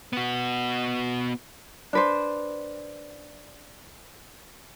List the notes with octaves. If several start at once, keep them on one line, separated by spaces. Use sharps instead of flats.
B3 F#4
D4 B4 C5